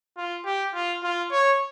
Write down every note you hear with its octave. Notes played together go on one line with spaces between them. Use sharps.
F4
G4
F4
F4
C#5